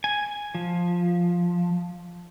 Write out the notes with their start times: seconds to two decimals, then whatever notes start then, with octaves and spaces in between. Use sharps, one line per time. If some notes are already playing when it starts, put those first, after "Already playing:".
0.04 G#5
0.55 F3